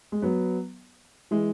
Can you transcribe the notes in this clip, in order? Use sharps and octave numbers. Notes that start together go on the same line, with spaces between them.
G#3
F#3 B3
E3 G#3